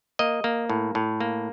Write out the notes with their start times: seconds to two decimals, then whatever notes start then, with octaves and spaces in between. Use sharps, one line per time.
0.19 A#3 D#5
0.44 A#3
0.70 A2
0.95 A2
1.21 A#3